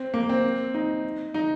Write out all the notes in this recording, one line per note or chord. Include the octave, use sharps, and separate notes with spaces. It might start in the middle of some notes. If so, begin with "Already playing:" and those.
Already playing: C4
A#3
C4
D#4
D#4